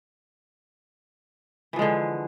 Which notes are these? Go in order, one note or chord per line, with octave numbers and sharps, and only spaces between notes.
D3 E3 F3 G#3